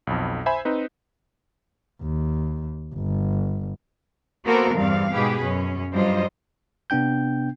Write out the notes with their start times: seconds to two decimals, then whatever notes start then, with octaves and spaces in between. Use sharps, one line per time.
0.07 B1 F2
0.46 C5 E5 G#5 B5
0.65 C4 D#4 B4
2.02 D#2
2.95 G1
4.45 A#3 B3 F#4 A4 A#4 C5
4.75 E2 G2 C4 F5
5.13 G#2 B2 G4 G#4 B4
5.42 F#2 C#4
5.93 G2 F#3 G3 F4 C5 D#5
6.90 C3 B3 D4 G5 G6